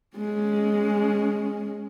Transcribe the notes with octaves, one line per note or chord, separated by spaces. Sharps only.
G#3 C#4